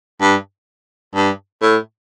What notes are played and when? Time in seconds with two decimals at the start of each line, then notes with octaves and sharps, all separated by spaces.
0.21 G2
1.15 G2
1.62 A2